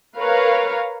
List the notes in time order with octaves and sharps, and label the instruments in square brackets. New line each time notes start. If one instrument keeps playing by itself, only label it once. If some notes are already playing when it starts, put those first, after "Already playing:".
[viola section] A#4 B4 C#5 F5 A#5